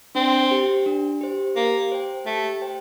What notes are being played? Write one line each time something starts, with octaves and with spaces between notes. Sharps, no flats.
C4 D4
G4 C5
D4
G4 C5
A#3 G4
C5 G5
A3 G4
C5 G5